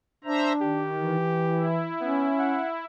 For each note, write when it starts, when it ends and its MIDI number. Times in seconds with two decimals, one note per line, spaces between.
0.24 0.87 62
0.24 0.53 72
0.24 0.53 76
0.24 0.53 82
0.61 1.16 51
0.61 1.68 67
0.99 1.93 52
1.45 2.85 64
2.01 2.31 59
2.01 2.60 61
2.39 2.68 78